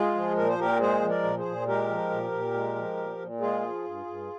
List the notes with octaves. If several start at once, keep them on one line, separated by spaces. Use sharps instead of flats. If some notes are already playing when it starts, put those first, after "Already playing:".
Already playing: G#3 F4 G#4
F3
A#2 A#4
C5
A#2 G4 A#4
G#3 G#4 C5
F3
A#4 D5
A#2
G#4 C5
A#2
G#3 G4 A#4
F3
A#2
A#2
G#3
F3
A#2
A#2
G#3 F4 G#4
F3
G2
G2